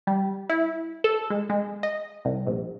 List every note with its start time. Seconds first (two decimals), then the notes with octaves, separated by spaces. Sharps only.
0.07 G3
0.49 E4
1.04 A4
1.30 G#3
1.50 G#3
1.83 D#5
2.25 C2
2.47 A#1